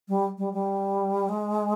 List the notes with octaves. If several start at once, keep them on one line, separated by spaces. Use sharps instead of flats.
G3
G3
G3
G#3